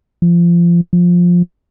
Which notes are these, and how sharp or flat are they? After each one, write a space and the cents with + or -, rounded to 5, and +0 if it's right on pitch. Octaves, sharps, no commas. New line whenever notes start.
F3 -25
F3 +10